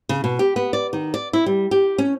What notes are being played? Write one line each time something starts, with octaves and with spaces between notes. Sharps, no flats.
C#3
B2
G4
B3
D5
D#3
D5
E4
G3
G4
C#4